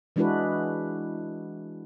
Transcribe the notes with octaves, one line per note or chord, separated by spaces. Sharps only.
E3 G#3 D4 E4 F#4 B4